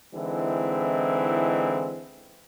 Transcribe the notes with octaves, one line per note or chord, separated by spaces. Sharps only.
D3 E3 G#3 C4 D#4 E4